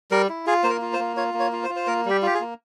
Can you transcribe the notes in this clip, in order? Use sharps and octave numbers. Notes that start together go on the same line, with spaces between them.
G3 A#4
E4
F4 G#4
A#3 C5
A#4
F4
C5
A#3
F4 C#5
A#3
C#5
F4
C5
F4
C5
A#3 A#4
G3 G4
F4 G4
G#4
A#3